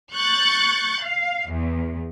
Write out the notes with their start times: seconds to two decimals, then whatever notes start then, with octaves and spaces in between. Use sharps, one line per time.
0.14 C#6 F#6 G6 A6
1.03 F5
1.50 E2